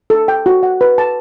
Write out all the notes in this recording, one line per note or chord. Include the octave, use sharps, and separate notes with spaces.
A4
G5
F#4
F#5
B4
A5